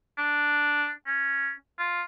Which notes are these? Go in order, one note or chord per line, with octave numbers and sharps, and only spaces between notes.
D4
C#4
F4